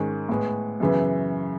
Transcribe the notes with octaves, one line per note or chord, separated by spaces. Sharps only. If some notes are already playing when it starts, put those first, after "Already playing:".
Already playing: G#2 D#3 G#3 C#4
A2 G#3 B3
F#2 C#3 E3 B3